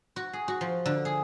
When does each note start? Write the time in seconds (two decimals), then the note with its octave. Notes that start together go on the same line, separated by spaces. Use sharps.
0.16 F#4
0.33 G#4
0.48 F#4
0.61 F3
0.86 D3
1.05 G#4